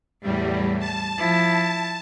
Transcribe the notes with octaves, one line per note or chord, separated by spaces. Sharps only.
E2 A2 G3
A5
F3 E4